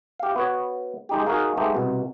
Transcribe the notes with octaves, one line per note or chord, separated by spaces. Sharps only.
G4 F5
B3 F#4 C#5
G#3 D#4 G4
D#4 F#4 G#4 A#4 F5
G#3 A3 B3 D#4 G4
C2 B2